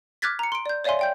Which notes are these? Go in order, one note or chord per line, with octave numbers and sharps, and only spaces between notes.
D6 F6 F#6 G#6 A6 B6
A#5 C#7
C6 D7
D5 G6
C#5 D5 E5 F5 G#5 C6
D5 G5 G6